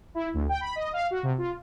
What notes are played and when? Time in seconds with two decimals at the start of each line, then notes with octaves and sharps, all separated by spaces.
0.14 E4
0.34 D2
0.49 G5
0.61 B5
0.76 D#5
0.93 F5
1.11 F#4
1.23 C3
1.38 F4